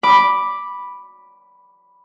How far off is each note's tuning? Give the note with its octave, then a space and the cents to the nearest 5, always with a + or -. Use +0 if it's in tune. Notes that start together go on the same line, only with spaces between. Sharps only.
B5 -5 D6 +0